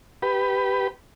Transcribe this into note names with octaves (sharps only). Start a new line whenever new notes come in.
G4 B4